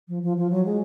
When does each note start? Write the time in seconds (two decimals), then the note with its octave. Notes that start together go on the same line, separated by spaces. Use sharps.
0.08 F3
0.23 F3
0.37 F3
0.50 F#3
0.65 G#3